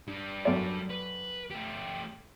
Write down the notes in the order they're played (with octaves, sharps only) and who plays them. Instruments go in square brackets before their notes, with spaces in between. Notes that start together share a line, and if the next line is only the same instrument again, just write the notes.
[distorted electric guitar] G3 D4
[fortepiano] F#2 A4 D5
[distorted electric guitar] B4
A3 G4